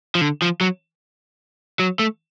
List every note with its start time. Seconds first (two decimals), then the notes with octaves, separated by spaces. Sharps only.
0.15 F3
0.21 D3
0.42 F3
0.61 F#3
1.79 F#3
1.99 A3